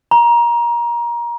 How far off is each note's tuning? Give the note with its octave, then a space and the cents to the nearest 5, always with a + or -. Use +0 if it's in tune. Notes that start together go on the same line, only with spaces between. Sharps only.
A#5 +25